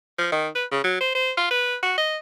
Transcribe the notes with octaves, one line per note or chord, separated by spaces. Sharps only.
F3
D#3
B4
C#3
F#3
C5
C5
F4
B4
F#4
D#5